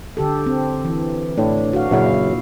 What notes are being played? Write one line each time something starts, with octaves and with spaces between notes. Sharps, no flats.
D3 G4 A4
C4
E3
A2 D4
F#4 F5
F#2 A#2 C#3 E4 F5